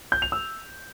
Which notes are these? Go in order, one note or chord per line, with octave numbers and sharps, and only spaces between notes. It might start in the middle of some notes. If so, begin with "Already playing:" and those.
G6
F7
E6